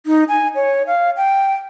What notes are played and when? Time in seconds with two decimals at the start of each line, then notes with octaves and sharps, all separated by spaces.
0.06 D#4
0.28 G#5
0.55 C#5
0.87 F5
1.17 G5